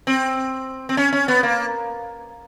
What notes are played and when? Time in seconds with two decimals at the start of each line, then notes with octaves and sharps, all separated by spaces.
0.07 C4
0.89 C4
0.97 C#4
1.13 C#4
1.28 B3
1.43 A#3